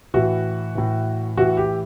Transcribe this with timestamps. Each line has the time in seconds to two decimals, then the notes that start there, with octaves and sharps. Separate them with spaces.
0.14 A2 E3 F#4
0.75 A2 E3
1.37 A2 E3 F#4
1.57 G4